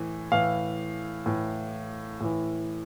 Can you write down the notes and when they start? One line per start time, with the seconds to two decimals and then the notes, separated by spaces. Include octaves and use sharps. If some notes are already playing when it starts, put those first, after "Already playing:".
Already playing: A2 E3
0.32 A2 E3 F5
1.26 A2 E3
2.21 A2 E3